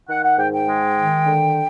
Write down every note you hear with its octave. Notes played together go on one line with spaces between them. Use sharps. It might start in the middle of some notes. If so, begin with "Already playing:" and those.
D#3 F#5
F#5
G#2 G5
G5
G#3
D#3
D3